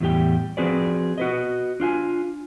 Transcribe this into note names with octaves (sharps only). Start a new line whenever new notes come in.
E2 A2 G3 G4 G5
F3 C4 F#4 G#4 B4 D5
F#4 B4 D#5
D4 F4 G5 G#5